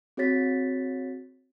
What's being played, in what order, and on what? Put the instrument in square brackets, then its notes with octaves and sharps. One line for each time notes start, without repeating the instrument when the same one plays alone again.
[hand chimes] C4 F#4 G#4 C#5 A6 B6